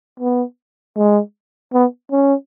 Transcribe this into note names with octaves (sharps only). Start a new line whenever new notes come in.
B3
G#3
B3
C#4